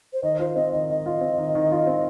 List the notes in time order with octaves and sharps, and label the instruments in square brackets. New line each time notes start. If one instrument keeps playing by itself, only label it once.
[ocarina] C5
[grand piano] D#3 [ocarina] D#5
[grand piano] F4 [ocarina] C5
[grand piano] C4 [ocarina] D#5
[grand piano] D#3 [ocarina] D#5
[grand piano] D#3 [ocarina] D#5
[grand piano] F4
C4
D#3
D#3
F4
C4